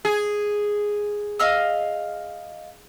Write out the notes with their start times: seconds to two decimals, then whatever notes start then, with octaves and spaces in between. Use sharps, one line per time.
0.05 G#4
1.39 D#5 F5 E6